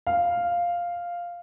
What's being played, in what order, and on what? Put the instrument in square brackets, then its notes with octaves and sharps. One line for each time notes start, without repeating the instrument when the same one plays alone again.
[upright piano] F5